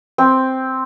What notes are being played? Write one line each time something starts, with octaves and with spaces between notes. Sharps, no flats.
C4